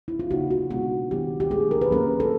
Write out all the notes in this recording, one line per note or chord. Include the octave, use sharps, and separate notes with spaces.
E4
F4
C#3 F#3 A#3 D#4 F#4
F#4
B2 G#3 B3 D4 F#4
D#3 F#3 B3 E4 G4
G4
F#3 A3 D4 G#4
A#4
B4
F#3 A#3 C#4 A#4
A4